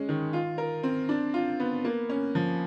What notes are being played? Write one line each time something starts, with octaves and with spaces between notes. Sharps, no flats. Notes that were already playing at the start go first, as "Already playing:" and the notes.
Already playing: G#3 C#4
D#3
F4
A#4
C4
D4
F4
B3
A#3
C#4
F3